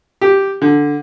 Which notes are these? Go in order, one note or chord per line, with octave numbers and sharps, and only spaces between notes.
G4
D3